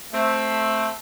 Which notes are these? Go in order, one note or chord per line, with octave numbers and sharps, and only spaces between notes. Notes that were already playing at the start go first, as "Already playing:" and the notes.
A3 C4